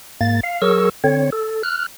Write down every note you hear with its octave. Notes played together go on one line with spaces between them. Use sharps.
G#2 A#3 A6
F5
F#3 G#4 A#4 C#6 E6
D3 C4 C#5
A4
F6 F#6